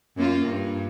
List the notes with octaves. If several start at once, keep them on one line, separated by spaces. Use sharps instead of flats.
F#2 A#3 F4
G2